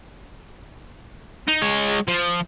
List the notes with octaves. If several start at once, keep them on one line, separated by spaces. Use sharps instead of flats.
D#4
G#3 C#5
F3